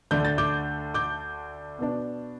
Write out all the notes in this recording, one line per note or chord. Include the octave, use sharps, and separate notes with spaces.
D2 D3 A3 D4 G6
A6
D6 G6
D6 G6
B2 B3 D4